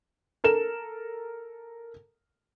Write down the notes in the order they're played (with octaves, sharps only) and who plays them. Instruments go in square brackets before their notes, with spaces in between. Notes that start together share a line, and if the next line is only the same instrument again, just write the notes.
[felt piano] A4 A#4 E7